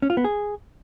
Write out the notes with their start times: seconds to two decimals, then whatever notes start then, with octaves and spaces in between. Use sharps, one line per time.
0.02 C#4
0.10 F4
0.17 B3
0.24 G#4